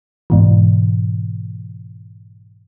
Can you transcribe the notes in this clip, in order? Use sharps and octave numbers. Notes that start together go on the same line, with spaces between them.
G#2 B2 E3